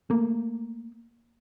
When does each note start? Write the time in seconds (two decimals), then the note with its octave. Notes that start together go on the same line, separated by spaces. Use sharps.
0.10 A3 A#3